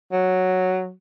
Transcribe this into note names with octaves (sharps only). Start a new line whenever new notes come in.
F#3